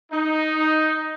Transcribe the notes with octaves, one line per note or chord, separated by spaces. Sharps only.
D#4